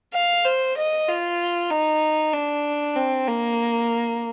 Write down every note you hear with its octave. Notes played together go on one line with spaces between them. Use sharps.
F5
C5
D#5
F4
D#4
D4
C4
A#3